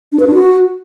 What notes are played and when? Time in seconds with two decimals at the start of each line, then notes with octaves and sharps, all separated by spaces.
0.12 D4
0.20 B4
0.27 D4
0.34 F#4